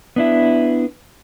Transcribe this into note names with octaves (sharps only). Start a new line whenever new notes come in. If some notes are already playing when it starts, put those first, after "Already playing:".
B3 D4 E4